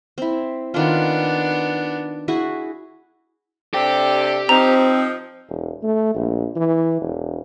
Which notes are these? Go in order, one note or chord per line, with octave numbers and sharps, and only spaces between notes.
C4 E4
D#3 B3 D4 F4
E4 F#4 G#4
C3 D4 G4 A4 G5
F3 C4 D#4 A#5
E1
A3
A#1
E3
E1